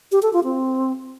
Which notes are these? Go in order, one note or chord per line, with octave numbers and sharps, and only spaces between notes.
G4
A4
F4
C4